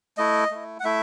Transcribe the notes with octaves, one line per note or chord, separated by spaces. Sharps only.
A3 E4 D#5
A3 E4
F#5
A3 E4 E5